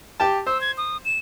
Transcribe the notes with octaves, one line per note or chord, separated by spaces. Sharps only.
G4 G5 A5
C5 E6
G#6
D#6
E7